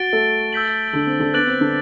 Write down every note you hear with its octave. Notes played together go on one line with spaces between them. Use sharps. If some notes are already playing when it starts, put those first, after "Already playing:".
Already playing: F#4 A6 D7 G7
A3 A4
E6 G6 B6 F#7
D3 D4
C4
D3 D4
B3 D6 F#6 A6 D7 F#7
C4
D3 D4